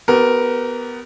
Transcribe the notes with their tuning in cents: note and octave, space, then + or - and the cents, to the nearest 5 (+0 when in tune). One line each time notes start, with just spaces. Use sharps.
B3 +5 G4 -30 A#4 +0